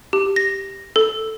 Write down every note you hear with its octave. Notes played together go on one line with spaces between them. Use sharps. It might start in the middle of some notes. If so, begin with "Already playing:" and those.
G4
A#6
A4